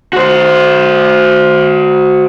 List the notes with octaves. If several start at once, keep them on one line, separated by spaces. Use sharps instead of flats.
F#4 C5